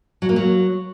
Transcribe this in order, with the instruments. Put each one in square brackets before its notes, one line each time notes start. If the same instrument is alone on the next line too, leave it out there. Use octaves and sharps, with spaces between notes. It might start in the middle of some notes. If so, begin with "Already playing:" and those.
[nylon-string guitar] F#3
A#3
F#3